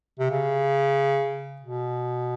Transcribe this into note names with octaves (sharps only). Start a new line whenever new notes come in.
C3
C#3
B2